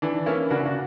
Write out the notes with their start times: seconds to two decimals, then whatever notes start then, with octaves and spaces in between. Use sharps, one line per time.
0.02 E3 D4
0.26 A#3 C#4 E4
0.50 C#3 D4 F#4
0.66 F#4